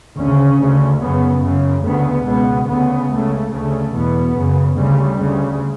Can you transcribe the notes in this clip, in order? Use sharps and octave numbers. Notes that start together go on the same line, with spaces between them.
D2 C#3 C#4
D2 C#3
F#2 C#3 B3
F#2 C#3
D2 C#3 B3
C#2 B2 B3
D2 C#3 B3
C#2 C#3 A3
D2 C#3 A3
E2 B2 B3
F#2 C#3
D2 C#3 G3
D2 C#3